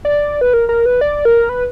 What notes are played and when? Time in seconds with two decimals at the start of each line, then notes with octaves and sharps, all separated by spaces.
0.05 D5
0.41 B4
0.54 A#4
0.69 A#4
0.86 B4
1.01 D5
1.25 A#4
1.49 B4